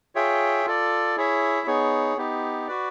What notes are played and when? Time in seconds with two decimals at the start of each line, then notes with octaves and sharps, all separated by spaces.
0.15 F4 G#4 C#5 E5 G5
0.66 F4 A4 D5
1.17 E4 G#4 C#5 E5
1.67 B3 D#4 G#4 C#5
2.17 B3 D#4 G4
2.68 F#4 B4 D5